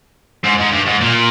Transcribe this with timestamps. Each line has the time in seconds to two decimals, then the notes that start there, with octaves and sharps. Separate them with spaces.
0.44 G#2
0.58 G#2
0.72 G2
0.86 G#2
1.01 A#2